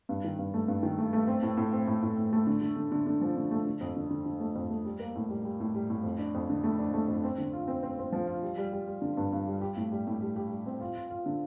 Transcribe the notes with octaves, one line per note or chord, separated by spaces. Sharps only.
G2
D#3
G2
A3
G2
D#3
A3
A3
C4
A2
A2
C4
A2
A2
A2
A3
D3
D3
D3
D3
D3
F3
D3
A3
D3
F2
D3
D3
D3
A3
F2
A3
G3
A#3
A2
G3
G3
A2
G3
A2
F2
D4
F2
D3
A3
D4
A3
F2
C4
D3
F4
C4
C4
C4
F3
F4
G3
G3
G3
G3
D3
G2
G2
G3
G4
A2
G3
A2
G3
G4
G3
C4
F4
F4
F4
D3